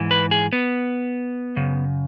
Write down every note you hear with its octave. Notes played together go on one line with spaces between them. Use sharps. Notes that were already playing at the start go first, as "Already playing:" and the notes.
Already playing: G#2 E3
B4
G#4
B3
F#2 C#3